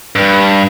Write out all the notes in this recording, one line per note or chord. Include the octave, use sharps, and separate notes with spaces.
G2